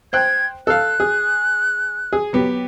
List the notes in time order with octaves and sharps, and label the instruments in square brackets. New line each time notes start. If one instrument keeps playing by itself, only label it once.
[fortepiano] C5 G5 F#6 [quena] G#6
[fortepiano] A4 F5 [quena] F#6
[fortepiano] G#4
G#4
F#3 B3 G4